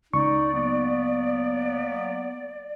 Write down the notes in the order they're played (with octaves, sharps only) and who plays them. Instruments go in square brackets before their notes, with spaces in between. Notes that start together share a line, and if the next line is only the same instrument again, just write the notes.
[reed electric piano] C#2 C#6 [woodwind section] D#4 [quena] D5
[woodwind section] F#3 A#3 B3